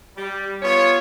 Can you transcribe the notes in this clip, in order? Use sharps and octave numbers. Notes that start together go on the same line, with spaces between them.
G3
B3 F4 C#5